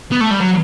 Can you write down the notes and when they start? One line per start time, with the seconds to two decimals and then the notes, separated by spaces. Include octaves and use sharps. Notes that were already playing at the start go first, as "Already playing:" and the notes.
0.12 B3
0.21 A3
0.31 G3
0.40 F#3